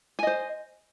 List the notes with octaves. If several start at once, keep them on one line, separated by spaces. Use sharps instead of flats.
C5 D#5 G#5